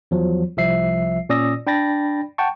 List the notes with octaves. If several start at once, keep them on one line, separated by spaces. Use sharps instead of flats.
E2 F3 F#3
C2 F3 E5 C7
A#2 C#4 D5 D#6 E6 A#6
D4 G5 B5 A6 A#6
F#5 G5 A5 C#6